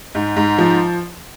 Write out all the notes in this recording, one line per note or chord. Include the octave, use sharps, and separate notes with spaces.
G#2
G#2
F3